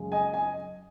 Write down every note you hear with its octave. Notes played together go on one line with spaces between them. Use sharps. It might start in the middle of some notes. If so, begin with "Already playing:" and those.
Already playing: F#2 C#3 G#3
D#5 G#5
D#5 G#5